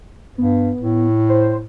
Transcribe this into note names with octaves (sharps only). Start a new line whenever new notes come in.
G2 B3
A2
C5